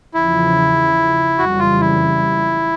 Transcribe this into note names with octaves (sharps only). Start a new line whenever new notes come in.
E2 C#3 F3 E4
F#1 F2 C#3 E3 G3 F#4
F4
E4